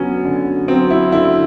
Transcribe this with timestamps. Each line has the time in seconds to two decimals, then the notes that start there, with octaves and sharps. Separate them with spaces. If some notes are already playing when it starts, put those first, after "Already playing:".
Already playing: D3 F#3 B3 C#4
0.25 D3
0.68 F#3 C4
0.90 E4
1.11 D3 E4